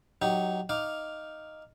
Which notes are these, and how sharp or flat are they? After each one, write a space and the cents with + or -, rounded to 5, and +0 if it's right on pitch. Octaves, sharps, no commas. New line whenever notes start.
F#3 +0 D#4 +0 G4 -15
D#4 +0 F5 +0 D6 +0